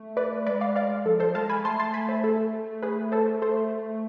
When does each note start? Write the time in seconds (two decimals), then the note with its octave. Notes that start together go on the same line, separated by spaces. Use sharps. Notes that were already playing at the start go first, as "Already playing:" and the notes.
Already playing: A3
0.17 B4 D5
0.47 G#3 B4 D5
0.61 D5 F5
0.76 D5 F5
1.05 F3 A4
1.20 A4 C5
1.35 G#3 F5 A5
1.49 G#5 B5
1.64 A3 A5 C6
1.79 A5 C6
1.94 G#5 B5
2.08 C5 E5
2.24 A4
2.82 G#4 B4
3.12 A4 C5
3.42 A4 C5